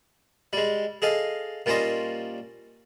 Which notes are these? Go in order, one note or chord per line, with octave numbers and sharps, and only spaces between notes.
G3 G#3
G#4 A4 D#5 F5
A#2 G3 C#4 C5 D#5